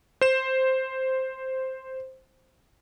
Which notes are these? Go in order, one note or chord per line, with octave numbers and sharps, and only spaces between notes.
C5 E7